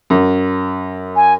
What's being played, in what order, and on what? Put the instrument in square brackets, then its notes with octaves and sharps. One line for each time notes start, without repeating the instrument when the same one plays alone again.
[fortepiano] F#2
[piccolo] G#5